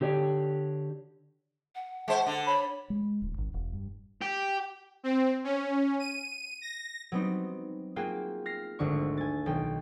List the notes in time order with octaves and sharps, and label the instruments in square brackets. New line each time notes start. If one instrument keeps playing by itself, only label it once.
[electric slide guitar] D3 G4 C#5 D5
[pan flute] F#5
[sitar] G#3 C5
D3
[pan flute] C#5 [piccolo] B5
[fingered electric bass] G#3
D1
G#1
E1
G2
[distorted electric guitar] G4
[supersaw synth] C4
C#4
D#7
A#6
[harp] F#3 G3 B3 C4 D#4
A#3 F4 F#4 G#4 G5
F6 A#6 C7
G#1 D2 D3 C#6
G#5 A6
B1 D#3 G5